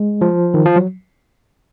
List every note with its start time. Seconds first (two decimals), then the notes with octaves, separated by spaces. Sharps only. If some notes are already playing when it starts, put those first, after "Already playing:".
Already playing: G#3
0.21 F3
0.54 D#3
0.66 F3
0.76 F#3